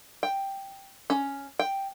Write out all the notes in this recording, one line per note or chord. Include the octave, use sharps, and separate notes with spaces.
G5
C#4
G5